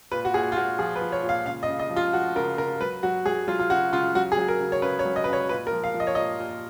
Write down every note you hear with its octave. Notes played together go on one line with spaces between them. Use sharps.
A#2 B4
F#4
A#2 G#4
F4
A#2 F#4
F3 G#4
B4
F3
C#5
A#2
F5
C#3 F5
D#5
C#3
D#5
F3
F4
F3 F#4
C#3 A#4
C#3 A#4
F#3 B4
F#3 F#4
F#3 G#4
F#3 F4
F4
C#3 F#4
C#3 F4
F#3 F#4
G#4
F#3
A#4
C#3
C#5
C#3 B4
C#5
F#3
D#5
C#3 B4
C#5
A#2 B4
A#4
F3
F5
F3
D#5
C#5
A#2 D#5
A#2